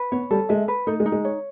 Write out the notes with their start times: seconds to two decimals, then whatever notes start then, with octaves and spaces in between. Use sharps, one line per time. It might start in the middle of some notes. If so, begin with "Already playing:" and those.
Already playing: B4
0.12 B3 C#5
0.31 G3 A4
0.49 G#3 E5
0.68 B4
0.87 A3 D#4
1.00 G#3
1.06 D#4
1.12 G#3
1.25 C#5